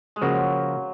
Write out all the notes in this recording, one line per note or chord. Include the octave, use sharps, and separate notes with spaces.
G#3
C#3 F3 F#3 A#3